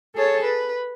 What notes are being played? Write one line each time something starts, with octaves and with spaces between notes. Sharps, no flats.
G#4 A4 C#5 A5
B4